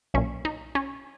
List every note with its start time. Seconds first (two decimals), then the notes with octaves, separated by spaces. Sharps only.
0.14 B1 A#2 C#4
0.45 D#4
0.75 C#4